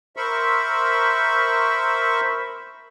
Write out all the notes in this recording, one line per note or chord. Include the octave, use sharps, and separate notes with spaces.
A#4 C5 E5 B5 C#6